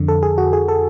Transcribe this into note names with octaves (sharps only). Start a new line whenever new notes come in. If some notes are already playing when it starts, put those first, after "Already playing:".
Already playing: F2 D3
A4
G#4
F#4
G#4
A4